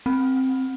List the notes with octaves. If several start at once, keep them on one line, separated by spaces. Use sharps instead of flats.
C4